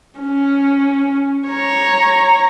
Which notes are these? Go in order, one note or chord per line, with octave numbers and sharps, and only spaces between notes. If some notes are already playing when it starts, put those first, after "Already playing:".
C#4
C#5 A#5